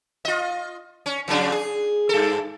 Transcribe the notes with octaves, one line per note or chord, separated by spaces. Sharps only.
F4 D#5
C#4
F2 C#3 D4
G#4
G2 A4